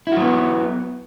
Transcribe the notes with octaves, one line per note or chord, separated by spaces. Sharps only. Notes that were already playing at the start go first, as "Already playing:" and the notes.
F#3 B3 E4 F#4